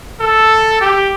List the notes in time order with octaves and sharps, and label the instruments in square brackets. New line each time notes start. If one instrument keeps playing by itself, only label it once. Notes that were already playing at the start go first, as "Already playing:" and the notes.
[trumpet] A4
G4